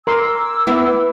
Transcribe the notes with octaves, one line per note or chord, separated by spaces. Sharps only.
A#4 G#5 C6 D6 E6
B3 E4